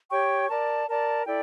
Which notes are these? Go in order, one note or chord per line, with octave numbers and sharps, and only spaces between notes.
G4 C#5 G5 C#6
A#4 D5 A5
A#4 D5 A5
E4 A4 D5 G5